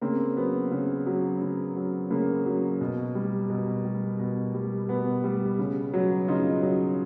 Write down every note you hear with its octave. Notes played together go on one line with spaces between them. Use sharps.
C#3 A#3 C4
F#3 B3
C#3
F#3
C#3
F#3
C#3 A#3
F#3
B2
G3
B2
G3
B2
G3
B2 B3
G3
C#3
F#3
C#3 D#4 F4
F#3